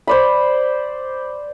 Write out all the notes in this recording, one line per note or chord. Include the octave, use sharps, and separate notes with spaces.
C5 D5 B5